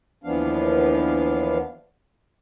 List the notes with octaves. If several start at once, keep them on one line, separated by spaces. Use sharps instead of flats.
D#2 E3 F3 B3 D4 F5